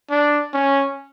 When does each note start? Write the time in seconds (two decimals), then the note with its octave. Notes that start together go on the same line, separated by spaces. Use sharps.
0.11 D4
0.54 C#4